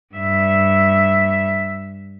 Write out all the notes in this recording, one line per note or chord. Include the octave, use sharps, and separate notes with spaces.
G2 E5